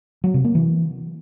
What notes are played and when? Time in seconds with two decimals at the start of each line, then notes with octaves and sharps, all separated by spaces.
0.24 F#3
0.34 C3
0.44 A#3
0.55 E3